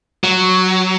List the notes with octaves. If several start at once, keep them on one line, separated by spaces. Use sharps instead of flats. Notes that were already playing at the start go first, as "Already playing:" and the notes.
F#3